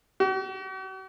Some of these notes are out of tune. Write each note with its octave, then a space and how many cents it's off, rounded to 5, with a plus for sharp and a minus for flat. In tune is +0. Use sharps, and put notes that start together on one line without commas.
F#4 +45